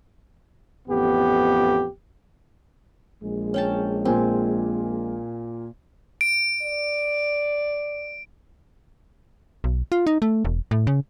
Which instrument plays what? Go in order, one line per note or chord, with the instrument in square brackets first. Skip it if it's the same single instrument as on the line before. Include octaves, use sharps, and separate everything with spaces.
[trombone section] A1 F2 B3 G4
A#1 G#3
[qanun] C#4 G5 A5
[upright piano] A#2 A#3 G#5 [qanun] C4
[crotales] D7
[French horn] D5
[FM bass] B1
F4
D#4
A3
E1
A2
C#3